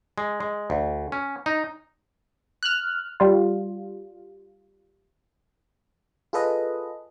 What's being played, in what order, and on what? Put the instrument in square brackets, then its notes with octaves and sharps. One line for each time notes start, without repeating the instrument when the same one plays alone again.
[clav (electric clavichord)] G#3
G#3
D2
C#4
D#4
[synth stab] F6 F#6
G3 F4
[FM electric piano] F4 G#4 A4 B4 D#5